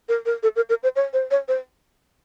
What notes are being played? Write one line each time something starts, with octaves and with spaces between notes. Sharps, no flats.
A#4
A#4
A4
A#4
A#4
C5
C#5
C5
C#5
C5